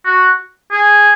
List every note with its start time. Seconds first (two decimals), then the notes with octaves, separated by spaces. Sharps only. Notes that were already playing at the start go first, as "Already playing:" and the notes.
0.06 F#4
0.72 G#4